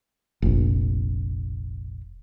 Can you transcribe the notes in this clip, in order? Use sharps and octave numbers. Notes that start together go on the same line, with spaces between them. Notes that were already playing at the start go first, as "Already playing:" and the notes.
F1 A#1